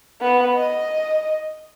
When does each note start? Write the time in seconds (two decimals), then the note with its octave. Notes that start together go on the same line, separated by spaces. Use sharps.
0.21 B3
0.55 D#5